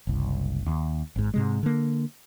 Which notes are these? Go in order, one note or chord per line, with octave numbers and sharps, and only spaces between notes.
F#1 C2
D#2
G#1 G#2
G#2 C3 G#3
D3 A#3